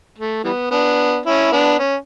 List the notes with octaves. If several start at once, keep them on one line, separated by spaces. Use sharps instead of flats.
A3
E3 G3 B3
B3 D4
C#4 E4
B3 D4
C#4